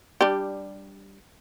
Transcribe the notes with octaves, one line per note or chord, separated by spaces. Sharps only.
G3 D4 G4